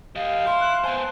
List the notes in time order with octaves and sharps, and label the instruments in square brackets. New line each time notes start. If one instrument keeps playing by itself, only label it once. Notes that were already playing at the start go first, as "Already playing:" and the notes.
[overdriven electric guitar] G4 D#5 [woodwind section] F5
[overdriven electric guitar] E4 [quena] C6
[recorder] F#6
[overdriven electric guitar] B3 C5 [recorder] G#5 [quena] A5